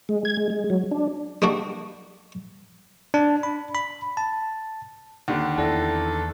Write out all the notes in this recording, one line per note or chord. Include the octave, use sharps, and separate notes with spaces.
G#3
G#6
G#3
G#3
F#3
D4
G3 A#3 D4 F#4
D4
B5
B5
A5
D#2 D3 F#5
E2 E4 A4 D5 A#6